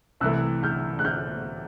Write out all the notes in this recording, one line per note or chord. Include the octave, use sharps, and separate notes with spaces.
C2 C3 E3 A3 E6 F#6
F6 G6
F#6
F6 G6